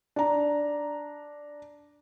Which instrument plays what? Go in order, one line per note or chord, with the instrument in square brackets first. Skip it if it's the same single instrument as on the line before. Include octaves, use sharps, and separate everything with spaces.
[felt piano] D4 A#5